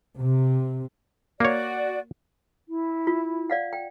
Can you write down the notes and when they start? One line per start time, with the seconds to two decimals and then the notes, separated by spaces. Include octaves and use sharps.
0.16 C3
1.40 A#3 F#4 C#5 D5
2.68 E4
3.07 F4
3.50 D5 F5 F#5
3.73 G5